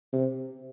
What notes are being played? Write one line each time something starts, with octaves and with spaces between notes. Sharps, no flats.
C3